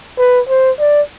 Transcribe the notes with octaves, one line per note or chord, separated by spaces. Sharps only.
B4
C5
D5